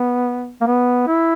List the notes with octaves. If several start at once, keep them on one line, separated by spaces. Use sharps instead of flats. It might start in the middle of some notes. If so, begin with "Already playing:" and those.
Already playing: B3
A#3
B3
E4